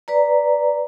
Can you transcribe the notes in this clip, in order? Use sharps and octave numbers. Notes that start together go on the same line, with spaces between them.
B4 D5 A#5